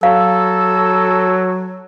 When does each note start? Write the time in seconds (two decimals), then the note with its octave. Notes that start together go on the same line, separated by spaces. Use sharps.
0.03 F#3 A4 F5 E6